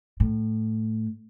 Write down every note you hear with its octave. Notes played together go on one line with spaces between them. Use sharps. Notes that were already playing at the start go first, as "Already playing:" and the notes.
A2